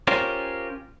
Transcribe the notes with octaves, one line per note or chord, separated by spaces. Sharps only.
C#4 F4 G4 A#4 C5